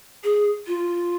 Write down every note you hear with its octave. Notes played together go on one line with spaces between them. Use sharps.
G#4
F4